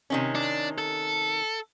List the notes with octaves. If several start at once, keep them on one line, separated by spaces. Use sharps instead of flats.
C3 D#3 C#4
D4
A4